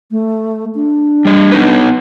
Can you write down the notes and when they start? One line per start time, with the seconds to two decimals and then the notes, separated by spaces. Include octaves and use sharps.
0.11 A3
0.75 D4
1.25 G3 D#5
1.52 B3 D#4 B4